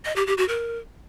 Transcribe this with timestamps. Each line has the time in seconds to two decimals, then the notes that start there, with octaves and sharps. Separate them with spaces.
0.05 D#5
0.16 G4
0.27 G4
0.38 F#4
0.48 A#4